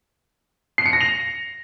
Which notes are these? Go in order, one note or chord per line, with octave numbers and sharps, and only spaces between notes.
C7
C#7
A#6
F7